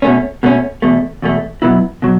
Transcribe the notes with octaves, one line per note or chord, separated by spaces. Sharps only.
B2 A3 C#4
B2 A3 C#4
E2 B2 A3
E2 B2 A3
B2 F#3 B3 E4
B2 F#3